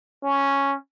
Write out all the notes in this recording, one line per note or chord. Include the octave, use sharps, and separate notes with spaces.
C#4